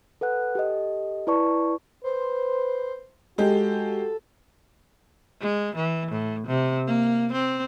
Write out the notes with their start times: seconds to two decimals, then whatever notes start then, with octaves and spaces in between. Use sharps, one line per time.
0.21 A4 B4 F#5 F#6
0.55 G4 A4 D#5
1.27 E4 B4 D5 A5 C#6
2.04 B4 C5
3.38 G#3 F#4 G4 A4
5.41 G#3
5.76 E3
6.11 A2
6.47 C3
6.87 A#3
7.33 C4